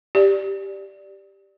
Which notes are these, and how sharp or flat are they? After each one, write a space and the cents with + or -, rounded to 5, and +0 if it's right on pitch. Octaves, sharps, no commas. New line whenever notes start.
G4 +0 D5 +0